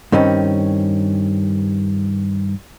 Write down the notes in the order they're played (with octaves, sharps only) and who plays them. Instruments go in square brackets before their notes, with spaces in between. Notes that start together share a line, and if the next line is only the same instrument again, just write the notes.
[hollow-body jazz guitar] G2 D#3 C4 C#4